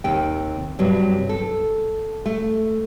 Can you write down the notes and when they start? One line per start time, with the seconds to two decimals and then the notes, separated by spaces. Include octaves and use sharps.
0.04 D#2 C3 G4 G5
0.79 G2 C3 F#3 G3
1.29 A4
2.26 A3